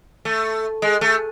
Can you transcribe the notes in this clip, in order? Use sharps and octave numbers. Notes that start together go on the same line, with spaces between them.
A3
G#3
A3